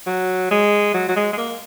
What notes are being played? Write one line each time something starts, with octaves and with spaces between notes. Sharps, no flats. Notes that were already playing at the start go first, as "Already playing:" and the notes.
F#3
G#3
F#3
F#3
G#3
G#3
A#3